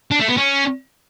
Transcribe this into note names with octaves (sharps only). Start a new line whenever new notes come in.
D4
A3
B3
C#4